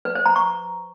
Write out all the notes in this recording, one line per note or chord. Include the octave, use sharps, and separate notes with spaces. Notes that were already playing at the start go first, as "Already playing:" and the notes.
B4
C5
A#5
C#6